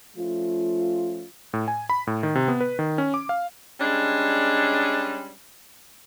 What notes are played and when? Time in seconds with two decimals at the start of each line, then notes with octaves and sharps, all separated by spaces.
0.17 F3 A3 C#4 F4
1.53 A2
1.68 G#5
1.90 B5
2.07 A2
2.23 D#3
2.35 C3
2.48 B3
2.61 B4
2.79 D#3
2.98 C#4
3.14 D6
3.29 F5
3.80 G3 G#3 C#4 D4